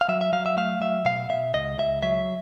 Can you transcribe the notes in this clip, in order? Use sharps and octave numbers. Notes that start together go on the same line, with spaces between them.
F5
F#3 E5
E5
F#3 F5
E5
A3 F5
F#3 E5
B2 F5
B2 E5
C#2 D#5
C#2 E5
F#3 E5